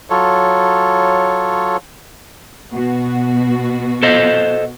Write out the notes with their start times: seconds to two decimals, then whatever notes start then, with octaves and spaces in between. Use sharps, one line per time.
0.10 F#3 F4 A4 C#5
2.73 B2 F#4
4.03 A4 C5 D#5